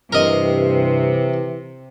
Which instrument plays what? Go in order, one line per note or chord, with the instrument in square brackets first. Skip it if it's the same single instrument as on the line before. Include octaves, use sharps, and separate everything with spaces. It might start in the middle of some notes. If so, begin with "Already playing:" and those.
[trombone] G2 [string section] C3 [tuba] E3 [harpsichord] A#4 D#5